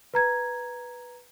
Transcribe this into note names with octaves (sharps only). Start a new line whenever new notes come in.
B4 A#5 G#6